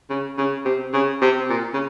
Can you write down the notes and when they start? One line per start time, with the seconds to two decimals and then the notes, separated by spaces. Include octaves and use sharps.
0.10 C#3
0.38 C#3
0.65 C3
0.93 C#3
1.21 C3
1.49 A#2
1.73 C#3